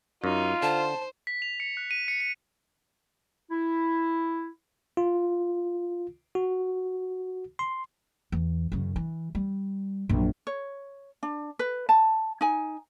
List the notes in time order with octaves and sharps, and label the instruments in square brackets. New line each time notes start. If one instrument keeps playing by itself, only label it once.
[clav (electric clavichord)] F#2 [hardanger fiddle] D#4 [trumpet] F4
[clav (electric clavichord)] D3 [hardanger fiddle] C5 [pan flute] A5
[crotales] B6
F7
C#7
F#6
D#7
C#7
C#7
[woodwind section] E4
[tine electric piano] F4
F#4
C6
[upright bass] E2
F#2 C#3
E3
G3
A#1 F#2
[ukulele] C#5
D4
B4
A5
D#4 G#5